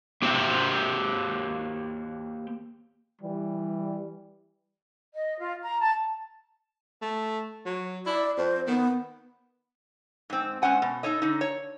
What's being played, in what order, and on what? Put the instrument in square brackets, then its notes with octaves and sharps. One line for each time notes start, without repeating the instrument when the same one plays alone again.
[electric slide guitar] A#3 G4 C5 G5
[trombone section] E3 G3
[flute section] D#5
F4
A#5
A5
[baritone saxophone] A3
F#3
[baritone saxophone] E4 [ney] D5
[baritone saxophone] F2 [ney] C5
[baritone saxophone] D#3 [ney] B3
[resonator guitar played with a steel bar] G#2 C4
G#3 C#4 C5 F#5 G#5
B2
D#4 A4 C#5 D#5
D3 D#4
C#5